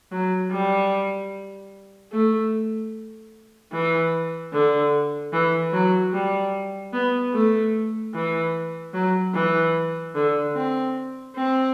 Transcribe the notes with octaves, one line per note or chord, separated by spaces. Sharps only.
F#3
G3
A3
E3
D3
E3
F#3
G3
B3
A3
E3
F#3
E3
D3
C4
C4